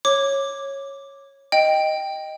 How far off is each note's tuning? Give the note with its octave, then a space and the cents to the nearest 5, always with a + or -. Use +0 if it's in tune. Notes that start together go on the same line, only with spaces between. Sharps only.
C#5 -10 D6 +0
D#5 +0 G5 +0